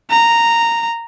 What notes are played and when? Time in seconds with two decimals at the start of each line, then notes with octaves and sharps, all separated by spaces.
0.11 A#5